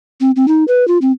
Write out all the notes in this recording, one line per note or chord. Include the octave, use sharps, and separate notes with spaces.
C4
C4
D#4
B4
F4
C4